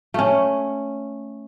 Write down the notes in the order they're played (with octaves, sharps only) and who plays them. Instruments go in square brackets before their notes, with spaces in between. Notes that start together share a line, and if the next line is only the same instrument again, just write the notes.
[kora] A3 C#4